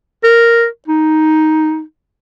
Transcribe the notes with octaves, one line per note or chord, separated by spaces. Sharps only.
A#4
D#4